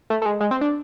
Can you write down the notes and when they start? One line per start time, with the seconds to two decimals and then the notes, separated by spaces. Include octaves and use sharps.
0.10 A3
0.22 A3
0.26 G#3
0.40 G#3
0.51 C4
0.61 D4